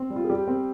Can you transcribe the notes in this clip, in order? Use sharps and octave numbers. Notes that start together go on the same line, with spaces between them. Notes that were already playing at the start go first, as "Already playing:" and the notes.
Already playing: C4
G3
F4
G#4
G3 G4
C4